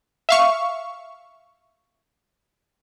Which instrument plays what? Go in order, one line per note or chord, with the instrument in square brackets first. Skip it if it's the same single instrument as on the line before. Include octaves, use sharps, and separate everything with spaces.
[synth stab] E5 F5 C#6